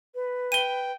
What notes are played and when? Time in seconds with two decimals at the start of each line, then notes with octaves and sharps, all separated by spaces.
0.15 B4
0.52 G5 D#7 G7